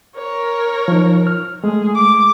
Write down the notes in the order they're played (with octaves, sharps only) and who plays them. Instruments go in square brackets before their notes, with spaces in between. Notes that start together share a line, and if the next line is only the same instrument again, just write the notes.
[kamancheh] A#4 C#5
[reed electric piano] F3 D#4
F6
[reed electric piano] G#3 A3 [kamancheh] G#4
[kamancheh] D6